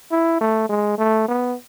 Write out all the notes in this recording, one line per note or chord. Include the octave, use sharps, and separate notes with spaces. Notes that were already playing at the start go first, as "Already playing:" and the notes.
E4
A3
G#3
A3
B3